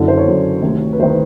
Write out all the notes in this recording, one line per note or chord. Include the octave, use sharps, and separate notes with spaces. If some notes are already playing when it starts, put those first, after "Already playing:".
Already playing: F#1 F#2 D3
C5
C#5
F#1 F#2 D3
D2 C3 D#3
B4
D2 C3 D#3 C5
B4